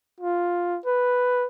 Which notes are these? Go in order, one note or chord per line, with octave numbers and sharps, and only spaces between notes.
F4
B4